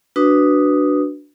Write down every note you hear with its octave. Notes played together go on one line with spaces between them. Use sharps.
D4 F#4 B4 D#6